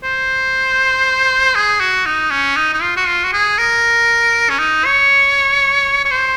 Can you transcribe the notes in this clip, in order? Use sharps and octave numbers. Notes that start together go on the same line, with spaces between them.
C5
G#4
F#4
D#4
C#4
D#4
D#4
F4
F#4
F4
F#4
G#4
A#4
C#4
D#4
C#5
C#5
C5